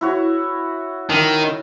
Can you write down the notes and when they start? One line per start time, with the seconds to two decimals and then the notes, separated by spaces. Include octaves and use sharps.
0.01 E4 F#4 C#5
1.10 D#3